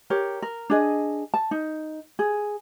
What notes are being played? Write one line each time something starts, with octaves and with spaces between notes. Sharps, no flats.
G4 A#4 C#5
A#4
D4 G#4 D#5
A5
D#4
G#4